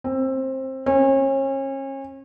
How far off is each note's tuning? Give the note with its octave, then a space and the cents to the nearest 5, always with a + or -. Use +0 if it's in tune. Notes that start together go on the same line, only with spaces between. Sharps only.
C4 +20
C#4 -35